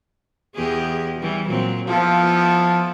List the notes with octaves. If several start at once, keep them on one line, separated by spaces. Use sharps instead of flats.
E2 G4 G#4
E3 G3
A#2 F#3 C4
F3 B3 E4 A4